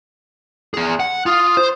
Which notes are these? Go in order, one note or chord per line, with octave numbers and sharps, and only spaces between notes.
B3 G#4
F#5
F4 D#6
C5